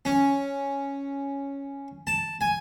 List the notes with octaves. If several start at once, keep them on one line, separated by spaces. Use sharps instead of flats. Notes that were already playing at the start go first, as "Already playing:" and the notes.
C#4
A5
G#5